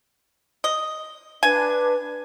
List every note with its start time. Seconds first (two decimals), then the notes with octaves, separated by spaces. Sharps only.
0.64 D#5
1.43 D4 B4 G#5